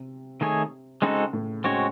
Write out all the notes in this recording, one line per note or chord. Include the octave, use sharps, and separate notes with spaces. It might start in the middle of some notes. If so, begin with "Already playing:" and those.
Already playing: C3
D#3 A3 D#4 G#4 C#5
C#3 G#3 C4 D#4 F#4 A4
A2
C#3 G#3 C4 F#4 C#5